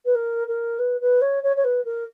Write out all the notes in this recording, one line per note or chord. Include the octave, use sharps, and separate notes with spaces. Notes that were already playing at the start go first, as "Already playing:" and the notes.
B4
A#4
A#4
B4
B4
C#5
C#5
C#5
B4
A#4